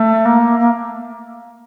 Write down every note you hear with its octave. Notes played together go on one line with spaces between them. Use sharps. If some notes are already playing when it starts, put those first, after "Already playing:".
Already playing: A3
A#3
A#3